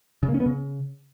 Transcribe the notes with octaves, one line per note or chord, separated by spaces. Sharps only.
C#3
A#3
C#4
B3
C#3